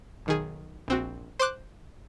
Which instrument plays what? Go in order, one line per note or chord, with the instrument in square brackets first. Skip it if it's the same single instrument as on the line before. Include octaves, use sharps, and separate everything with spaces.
[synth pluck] B1 D#3 G#4
A#1 C4 F#4
C5 C6 D6 F#6